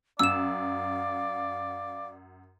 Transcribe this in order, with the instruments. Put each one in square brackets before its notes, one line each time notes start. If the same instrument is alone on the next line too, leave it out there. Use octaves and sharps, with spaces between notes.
[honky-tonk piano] F#2 [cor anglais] D5 [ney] F5 [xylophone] E6 E7